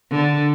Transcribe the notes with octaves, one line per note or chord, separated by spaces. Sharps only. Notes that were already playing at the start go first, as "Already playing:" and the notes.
D3